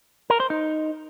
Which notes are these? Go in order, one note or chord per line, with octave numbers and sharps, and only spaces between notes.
A#4
C5
D#4